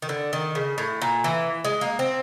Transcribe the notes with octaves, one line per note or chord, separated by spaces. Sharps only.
D#3
D3
D#3
C#3
A2
A#2
E3
G#3
A#3
C4